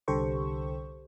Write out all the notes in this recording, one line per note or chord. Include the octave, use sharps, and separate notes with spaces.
C2 D3 G4 A4 C5 C#6